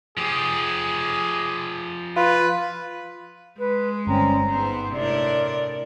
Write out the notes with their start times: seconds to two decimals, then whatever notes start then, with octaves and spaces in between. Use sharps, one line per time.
0.18 F3 G4 G#4
2.16 F4 B4
3.58 G#3 B4
4.07 G1 G3 C4 C#4 A#5
4.50 G#2 B3 C4 C5
4.92 A2 C3 D4 A#4 D5